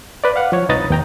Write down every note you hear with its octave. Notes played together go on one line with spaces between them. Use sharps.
B4 D5
F5 F#5
F3 C#5
C2 D#4 B4 A#5 D#6 A6
D#2 G5 A#5